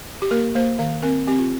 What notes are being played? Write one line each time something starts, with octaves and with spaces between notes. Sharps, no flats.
G4
A#3 A#4
A#3 C5
D#3 F5
C4 A#4
C4 G4
F4